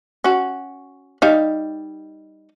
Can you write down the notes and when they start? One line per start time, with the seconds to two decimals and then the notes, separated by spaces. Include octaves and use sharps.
0.24 C#4 F#4
1.22 G3 D#4 F5